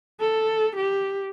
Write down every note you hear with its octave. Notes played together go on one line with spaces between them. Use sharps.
A4
G4